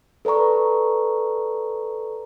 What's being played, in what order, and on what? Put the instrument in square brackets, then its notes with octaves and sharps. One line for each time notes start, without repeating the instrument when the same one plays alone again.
[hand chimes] A4 B4 D5 A#5 C#6